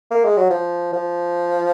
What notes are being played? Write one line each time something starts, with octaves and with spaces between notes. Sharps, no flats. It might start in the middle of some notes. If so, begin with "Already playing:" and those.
A#3
G#3
F#3
F3
F3